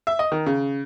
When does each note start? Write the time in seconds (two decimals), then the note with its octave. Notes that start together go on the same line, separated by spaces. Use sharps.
0.07 E5
0.19 D#5
0.32 D#3
0.46 C#3